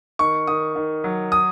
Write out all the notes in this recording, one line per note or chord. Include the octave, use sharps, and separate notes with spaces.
D#3 C#6
D#3 D#6
D#3
F#3
D#6